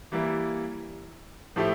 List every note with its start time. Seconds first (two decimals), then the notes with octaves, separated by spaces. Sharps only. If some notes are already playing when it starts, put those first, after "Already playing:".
0.12 E3 G3 A#3 E4
1.56 A2 F3 A3 E4 G4